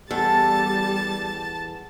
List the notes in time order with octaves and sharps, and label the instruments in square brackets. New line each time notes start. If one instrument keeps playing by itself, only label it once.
[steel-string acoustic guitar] E2 A4 [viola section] G3 [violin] A5 A6